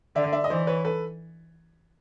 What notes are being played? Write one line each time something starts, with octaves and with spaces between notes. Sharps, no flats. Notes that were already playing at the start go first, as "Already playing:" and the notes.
D3 D5 E5
D5 E5
D#5
E3 C5 D5
B4 C#5
A4 B4